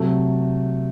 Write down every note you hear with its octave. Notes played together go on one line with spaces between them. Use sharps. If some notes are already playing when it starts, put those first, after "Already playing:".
Already playing: C3 F#3 A3